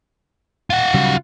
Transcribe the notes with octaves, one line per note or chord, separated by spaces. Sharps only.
F4 F#5
C#3 F#3 G3